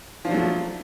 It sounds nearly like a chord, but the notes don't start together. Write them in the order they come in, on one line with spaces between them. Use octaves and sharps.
F3 D3 F#3 A3